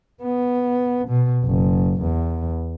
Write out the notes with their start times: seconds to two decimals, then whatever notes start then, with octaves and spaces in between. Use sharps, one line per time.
0.23 B3
1.08 B2
1.44 F#1
2.02 E2